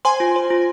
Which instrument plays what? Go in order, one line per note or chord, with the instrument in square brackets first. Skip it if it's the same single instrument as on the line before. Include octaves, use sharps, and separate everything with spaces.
[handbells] C5 [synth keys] G#5 C6
[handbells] F4
C5
F4